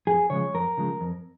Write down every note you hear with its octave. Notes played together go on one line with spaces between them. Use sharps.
F2 G#4
C#3 F3 G#3 C#5
F2 A#4
C#3 F3 G#3
F2